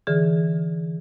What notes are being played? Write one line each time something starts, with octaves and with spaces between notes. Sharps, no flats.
D3 E3 G#4